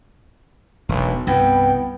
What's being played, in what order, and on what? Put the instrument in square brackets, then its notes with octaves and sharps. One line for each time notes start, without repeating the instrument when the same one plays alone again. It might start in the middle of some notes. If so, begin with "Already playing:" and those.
[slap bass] E1 [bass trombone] B1
[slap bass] C2 G2 [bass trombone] B3 [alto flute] G5